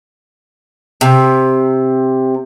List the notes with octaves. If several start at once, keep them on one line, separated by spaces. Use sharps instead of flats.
C3